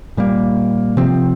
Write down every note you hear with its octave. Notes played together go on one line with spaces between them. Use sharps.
A#2 G3 A#3
C3 F3 C4